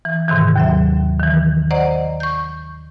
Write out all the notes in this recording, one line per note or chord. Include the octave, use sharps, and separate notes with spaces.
E3
G#2 C3 D#3 E3
D#2 F#3 E5
D#3 E3
C5 D5 D#5 F#5 A#5
C#6 G6